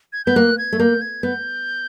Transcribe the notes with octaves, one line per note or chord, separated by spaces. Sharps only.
G#6
B3 G6
A#3 F#6
G#6
A3
A#3 G6
G#6
B3 G6